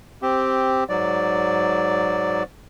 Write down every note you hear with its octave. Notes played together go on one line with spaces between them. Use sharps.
C4 G4
G#2 F#3 D5